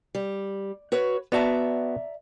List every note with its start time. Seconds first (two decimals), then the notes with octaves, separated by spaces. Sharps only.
0.15 G3
0.92 F#4 B4 C#5
1.32 B3 F#4 D5 E5 A5 A#5